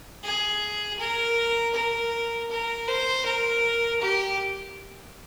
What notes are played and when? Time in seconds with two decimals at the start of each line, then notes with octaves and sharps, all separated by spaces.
0.24 G#4
1.00 A#4
1.74 A#4
2.50 A#4
2.88 C5
3.25 A#4
4.02 G4